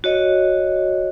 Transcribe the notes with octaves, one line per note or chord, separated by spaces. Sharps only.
F#4 C#5 D#5